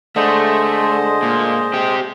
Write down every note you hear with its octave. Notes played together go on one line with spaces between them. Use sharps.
D3 G#3 A3 C5 D#5
A#2
C4 G4